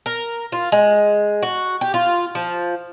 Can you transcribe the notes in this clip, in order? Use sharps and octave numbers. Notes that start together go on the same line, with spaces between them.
A#4
F4
G#3
F#4
G4
F4
F3